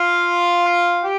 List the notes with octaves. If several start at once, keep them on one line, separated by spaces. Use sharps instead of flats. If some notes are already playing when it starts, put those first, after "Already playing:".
Already playing: F4 F5
G4 G5